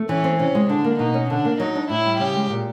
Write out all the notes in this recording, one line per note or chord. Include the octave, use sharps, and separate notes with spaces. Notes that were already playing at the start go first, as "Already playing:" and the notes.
Already playing: A3
E3 C#4
C4
C3 C#4
G#3
D3 D4
A#3
B2 D#4
C#4
D3 D4
A#3
F#3 D#4
D4
A2 E4
G3
C#3 G4
G#3
A#2